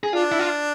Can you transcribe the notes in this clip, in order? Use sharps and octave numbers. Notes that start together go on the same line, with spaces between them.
G#4
D4 F4
E4
F4